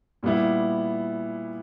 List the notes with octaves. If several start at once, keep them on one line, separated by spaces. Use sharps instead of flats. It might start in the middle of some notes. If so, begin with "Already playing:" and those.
A#2 G3 B3 E4